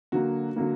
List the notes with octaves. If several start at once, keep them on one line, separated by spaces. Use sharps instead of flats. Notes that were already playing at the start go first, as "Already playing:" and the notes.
D3 F#3 A#3 F#4
D3 F#3 A#3